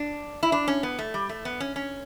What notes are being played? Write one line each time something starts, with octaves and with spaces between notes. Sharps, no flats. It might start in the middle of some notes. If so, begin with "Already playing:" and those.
Already playing: D4
E4
D4
C#4
B3
A3
G3
A3
B3
C#4
C#4